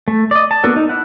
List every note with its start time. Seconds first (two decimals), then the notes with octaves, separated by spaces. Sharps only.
0.08 A3
0.31 D5 D#5
0.51 A5
0.63 A#3 B3 D4 F#4 A4
0.76 D#4
0.89 E4 F#5